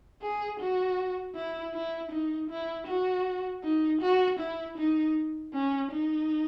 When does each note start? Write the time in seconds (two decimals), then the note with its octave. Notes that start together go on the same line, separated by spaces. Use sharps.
0.22 G#4
0.60 F#4
1.36 E4
1.74 E4
2.12 D#4
2.50 E4
2.87 F#4
3.64 D#4
4.02 F#4
4.40 E4
4.78 D#4
5.54 C#4
5.92 D#4